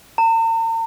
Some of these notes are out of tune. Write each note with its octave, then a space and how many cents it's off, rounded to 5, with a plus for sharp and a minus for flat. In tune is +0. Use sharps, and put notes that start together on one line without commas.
A#5 -45